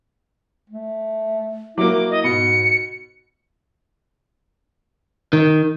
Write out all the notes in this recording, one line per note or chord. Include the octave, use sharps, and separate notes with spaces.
A3
F#3 A#3 E4 D6
D#5
G#2 B2 C#7
D#3